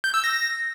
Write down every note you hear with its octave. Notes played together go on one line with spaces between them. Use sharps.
G6
E6
A#6